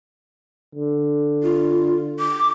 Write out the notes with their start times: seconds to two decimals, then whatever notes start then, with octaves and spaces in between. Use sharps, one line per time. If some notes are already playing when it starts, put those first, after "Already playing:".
0.75 D3
1.43 F4
2.19 D6